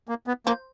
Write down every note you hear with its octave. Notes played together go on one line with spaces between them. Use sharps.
A#3
B3
F3 A#3